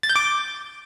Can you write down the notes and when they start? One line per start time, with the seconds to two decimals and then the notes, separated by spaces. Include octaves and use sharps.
0.03 A6
0.09 G6
0.16 D6